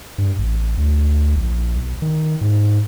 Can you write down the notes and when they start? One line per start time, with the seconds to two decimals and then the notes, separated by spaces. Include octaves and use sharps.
0.18 G2
0.39 A1
0.78 D2
1.35 A#1
1.75 B1
2.02 D#3
2.41 G#2